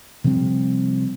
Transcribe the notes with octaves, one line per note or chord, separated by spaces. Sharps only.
C3 F3 G3 C4